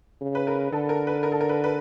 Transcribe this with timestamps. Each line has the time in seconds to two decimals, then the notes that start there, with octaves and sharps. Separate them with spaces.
0.21 C#3
0.35 B4
0.47 A#4
0.72 D3 A4
0.89 A#4
1.07 B4
1.23 A#4
1.32 A4
1.41 A#4
1.49 B4
1.64 B4